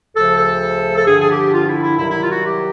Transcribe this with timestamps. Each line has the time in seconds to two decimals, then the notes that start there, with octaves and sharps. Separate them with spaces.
0.15 D2 C#3 F3 A4
0.37 A4
0.97 A4
1.06 G2 D3 F3 G#4
1.20 G#4
1.30 G4
1.52 F4
1.67 E4
1.82 E4
1.97 C2 C3 D#3 F#3 E4
2.09 E4
2.21 F4
2.32 F#4
2.44 G4